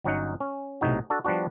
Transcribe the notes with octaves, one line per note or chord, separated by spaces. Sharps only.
G1 F#3 C#4 D#4 F#5
C#4
B1 A2 C3 D#4 F#4
D4 F#4 A4
F3 G3 B3 D4 F#4